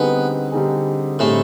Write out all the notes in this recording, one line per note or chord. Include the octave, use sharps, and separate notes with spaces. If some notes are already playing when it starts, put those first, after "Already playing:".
Already playing: D3 G3 B3 C4 D#4 G#4
D3 G3 C4 D#4 G#4
A2 D3 G3 A3 C4 D#4 G#4